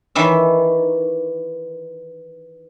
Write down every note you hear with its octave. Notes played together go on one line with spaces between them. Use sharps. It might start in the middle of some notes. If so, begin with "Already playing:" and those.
D#3 E3 E5